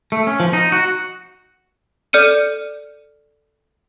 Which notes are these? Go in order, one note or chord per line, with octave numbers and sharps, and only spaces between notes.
A3
C#4
F3
D#4
F#4
A4 D5 F6 C#7 D#7